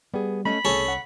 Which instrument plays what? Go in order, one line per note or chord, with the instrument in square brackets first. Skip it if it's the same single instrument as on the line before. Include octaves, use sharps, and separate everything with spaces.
[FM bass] G3 [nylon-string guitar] B3 G#4
[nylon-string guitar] A3 C#4 D#5 [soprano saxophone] B5
[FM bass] C2 [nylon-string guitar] A3 G#4 G#5 [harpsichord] C#4 A4
[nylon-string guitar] F#5